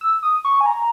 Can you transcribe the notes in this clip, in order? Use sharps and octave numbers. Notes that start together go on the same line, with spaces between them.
E6
D#6
C#6
G#5
A#5